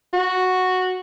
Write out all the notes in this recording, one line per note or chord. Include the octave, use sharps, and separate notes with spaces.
F#4